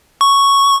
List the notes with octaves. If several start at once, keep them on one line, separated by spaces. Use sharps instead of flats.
C#6